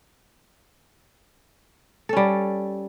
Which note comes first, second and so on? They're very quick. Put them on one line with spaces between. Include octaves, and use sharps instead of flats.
A4 C#4 G3